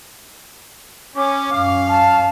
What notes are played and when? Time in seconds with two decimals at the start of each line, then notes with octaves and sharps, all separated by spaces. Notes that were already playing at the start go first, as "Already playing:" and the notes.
1.16 C#4 D6
1.52 F#2 C#4 F5
1.88 A5